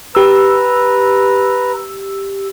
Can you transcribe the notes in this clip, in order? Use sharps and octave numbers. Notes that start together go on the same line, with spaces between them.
G4 B4 A#5 E6